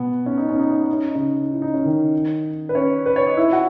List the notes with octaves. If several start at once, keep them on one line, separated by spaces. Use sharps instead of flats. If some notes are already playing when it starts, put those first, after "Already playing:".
Already playing: B2 B3
C#4
D#4
C#4
D#4
C#4
D#4
C#4
D#4
C#3 C#4
E4
D#4
C#4
D#3 D#4
B4
C#4 C#5
B4
C#5
D#5
E4 E5
F#4 F#5